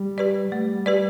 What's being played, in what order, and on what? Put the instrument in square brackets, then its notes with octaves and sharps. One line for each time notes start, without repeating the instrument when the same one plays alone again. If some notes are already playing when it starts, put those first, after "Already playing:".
Already playing: [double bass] G3
[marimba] G4 B4 D5
[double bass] G3 [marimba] A3
[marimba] G4 B4 D5